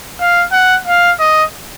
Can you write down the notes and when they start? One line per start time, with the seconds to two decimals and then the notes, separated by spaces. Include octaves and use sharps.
0.20 F5
0.52 F#5
0.87 F5
1.20 D#5